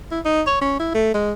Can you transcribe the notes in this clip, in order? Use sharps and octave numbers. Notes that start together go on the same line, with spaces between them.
E4
D#4
C#5
C#4
E4
A3
G#3